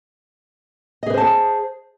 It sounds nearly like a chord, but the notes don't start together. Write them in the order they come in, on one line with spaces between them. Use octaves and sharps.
D#5 G#4 B4 C5 A5